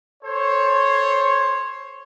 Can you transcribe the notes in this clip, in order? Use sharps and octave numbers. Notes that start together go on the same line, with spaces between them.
A4 C5 C#5